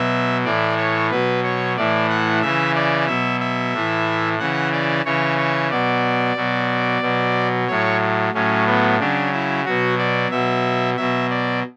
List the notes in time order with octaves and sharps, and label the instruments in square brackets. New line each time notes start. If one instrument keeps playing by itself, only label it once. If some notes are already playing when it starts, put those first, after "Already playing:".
Already playing: [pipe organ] B2 F#3 E5
A2 E3 D5
C#5
B2 F#3 B4
C#5
A2 E3 D5
F#5
C#3 E3 E5
D5
B2 F#3 E5
E5
A2 E3
C#3 E3 F#5
D5
C#3 E3 C#5
C#5
B2 F#3 D5
B2 F#3
B2 F#3
A2 F#3 C#5
A2 F#3 C#4
B3
C#3 F#3 D4
E4
B2 F#3 F#4
D5
B2 F#3 E5
B2 F#3 E5
D5